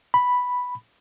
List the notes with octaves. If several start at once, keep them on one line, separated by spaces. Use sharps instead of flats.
B5